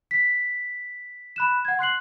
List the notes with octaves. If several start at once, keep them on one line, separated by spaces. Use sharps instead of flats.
B6
B5 F#6 E7
F#5 G#6
C6 F#6 C7 F#7